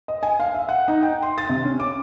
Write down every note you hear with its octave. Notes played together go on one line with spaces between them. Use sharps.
D#5
G#5
F5
E5
F#5
D#4
G5
C6
A6
C3
C#4
D6